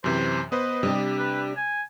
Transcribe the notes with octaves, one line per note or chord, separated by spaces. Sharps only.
F#2 C3 E3 C5
B3 B4 C5 D#5
C3 G3 D4 G4
B4
G#5